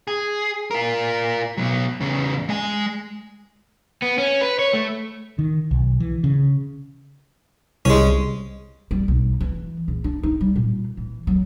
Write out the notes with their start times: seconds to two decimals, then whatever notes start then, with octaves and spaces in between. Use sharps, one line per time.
0.07 G#4
0.71 F4 A#4
1.58 B2 F#3
2.00 E2 C#3
2.49 G#3 G#5
4.02 B3
4.18 C#4
4.41 B4
4.59 C#5
4.73 A3
5.39 D#3
5.71 B1
6.00 E3
6.24 C#3
7.85 C2 G#3 C#4
8.91 G3
9.08 B1
9.40 E3
9.88 A#1
10.04 D4
10.23 D#4
10.41 G3
10.56 A#2
10.97 E3
11.27 F#3